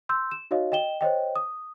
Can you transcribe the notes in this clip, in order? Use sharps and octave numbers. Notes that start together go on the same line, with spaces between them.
C6 E6 G6
E7
D#4 F#4 C#5 D#5 F5
D#5 G5 E7 G7
C5 C#5 D#5 G5
D#6